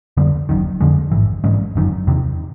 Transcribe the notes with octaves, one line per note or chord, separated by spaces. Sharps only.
F2 D3 G3 B3
F#1 F#2 D#3
F2 D3 F3 G#3
A1 G#2 E3
G#2 E3 G#3 C#4
G1 F#2 D#3
E2 C3 D#3